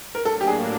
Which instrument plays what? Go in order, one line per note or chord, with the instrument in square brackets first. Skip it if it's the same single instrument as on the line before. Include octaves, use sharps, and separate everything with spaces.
[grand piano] A#4
[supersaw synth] A2 F#3 A#3 D4 [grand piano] A4
[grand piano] G4
G#4